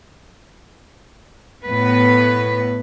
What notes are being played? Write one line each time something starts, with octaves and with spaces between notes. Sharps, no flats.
A2 B3 B4